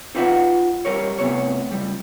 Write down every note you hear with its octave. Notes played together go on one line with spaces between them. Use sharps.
D#4 F4 B4 D5 E5 F#5
G3 A#4 C#5
A2 C3 B3 C#5
C#2 G3